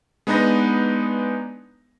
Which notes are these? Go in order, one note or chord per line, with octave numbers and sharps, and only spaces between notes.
G#3 B3 D4 D#4 B4 A#6